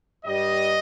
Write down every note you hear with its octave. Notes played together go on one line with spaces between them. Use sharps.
G2 G3 D#5